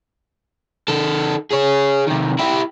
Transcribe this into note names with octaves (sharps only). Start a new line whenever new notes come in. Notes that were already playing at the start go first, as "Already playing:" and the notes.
D#3 A4
G#4 C#5
C3 D#3
E4 G4